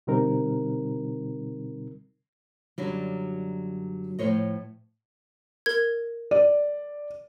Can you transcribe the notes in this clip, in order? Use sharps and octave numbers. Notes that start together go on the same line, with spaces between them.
B2 D3 G3 C4 D#4 A#4
F#2 D3 F#3 G3
A2 F3 C5 C#5 D#5
A#4 G#6
D5